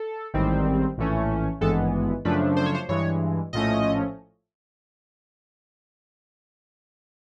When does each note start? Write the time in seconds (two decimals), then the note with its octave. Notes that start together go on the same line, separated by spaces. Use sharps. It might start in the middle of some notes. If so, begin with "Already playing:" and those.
Already playing: A4
0.34 A1 G#2 D#3 G3 C4
0.97 A#1 A2 E3 A3 C#4
1.61 G#1 G2 E3 G#3 B3 A4
2.25 F#2 C#3 F3 A3 D4 B4
2.57 C5
2.66 C#5
2.75 C5
2.89 G2 E3 G#3 C#5
3.53 A#1 A2 F3 A3 C#4 D#5